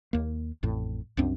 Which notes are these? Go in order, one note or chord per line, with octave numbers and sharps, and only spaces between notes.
D#2 A#3
A1 F2 A2
C2 F#2 C4 D4